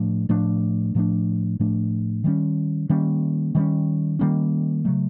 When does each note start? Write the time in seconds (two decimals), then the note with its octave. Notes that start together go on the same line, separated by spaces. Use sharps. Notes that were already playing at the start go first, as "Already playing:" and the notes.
Already playing: A2 F3 A3 D4
0.29 A2 F3 A3 D4
0.95 A2 F3 A3 D4
1.60 A2 F3 A3 D4
2.24 D#3 G3 A#3 C#4
2.89 D#3 G3 A#3 C#4
3.55 D#3 G3 A#3 C#4
4.19 D#3 G3 A#3 C#4
4.85 C#3 F#3 A3